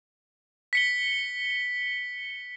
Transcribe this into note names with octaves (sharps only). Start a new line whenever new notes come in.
B6 C#7 G7